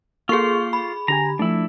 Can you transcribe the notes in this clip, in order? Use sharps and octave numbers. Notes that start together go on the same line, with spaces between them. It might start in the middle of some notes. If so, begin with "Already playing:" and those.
A#3 F4 G#4 A4 C6 C#6
B5
D3 G4 G#5 A#5
F3 A3 D4 E4